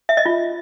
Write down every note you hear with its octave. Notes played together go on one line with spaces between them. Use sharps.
E5
D#5
F4